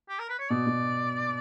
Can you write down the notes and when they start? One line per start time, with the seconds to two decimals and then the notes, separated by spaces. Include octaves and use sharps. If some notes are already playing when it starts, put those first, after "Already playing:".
0.09 G4
0.19 A#4
0.30 B4
0.40 C#5
0.50 B2 D5
0.67 B2